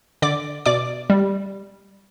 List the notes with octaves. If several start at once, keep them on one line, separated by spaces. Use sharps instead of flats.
D3 D5 D6
B2 D5 D6
G3